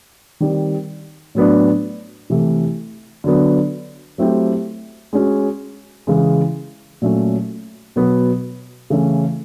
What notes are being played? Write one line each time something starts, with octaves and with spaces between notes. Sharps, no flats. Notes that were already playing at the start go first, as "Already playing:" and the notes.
D#3 G3 C4
A2 F#3 B3 D4
C3 E3 A3
D3 F#3 B3
F#3 A3 C4 E4 G4
G#3 C#4 F#4
C#3 E3 G#3
A#2 F#3 A3 C#4
B2 F#3 B3
C#3 E3 A3 C#4 E4